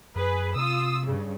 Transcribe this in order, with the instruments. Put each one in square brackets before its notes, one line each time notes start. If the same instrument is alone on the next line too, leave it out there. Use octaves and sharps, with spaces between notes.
[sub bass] F#2 [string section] G#4 B4
[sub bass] C3 [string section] F4 D#6 E6
[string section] G2 C#3